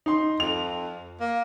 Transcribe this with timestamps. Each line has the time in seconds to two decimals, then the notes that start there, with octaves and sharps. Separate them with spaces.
0.06 D#4 C6
0.40 F2 F7
1.20 A#3